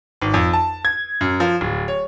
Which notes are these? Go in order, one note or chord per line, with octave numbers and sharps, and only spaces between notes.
G#1
F2
A5
G#6
F#2
F3
D1
C#5